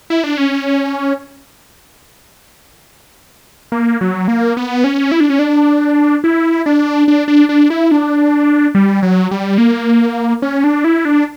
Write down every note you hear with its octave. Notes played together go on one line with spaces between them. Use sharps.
E4
D4
C#4
A#3
F#3
A#3
B3
C#4
E4
D4
C#4
D4
E4
D4
D4
D4
D4
E4
D4
G3
F#3
G3
A#3
C#4
D4
E4
D4